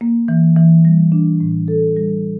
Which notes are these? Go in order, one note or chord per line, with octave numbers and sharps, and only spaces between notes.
A#3
E3
E3
G3
D4
A2
A4
G3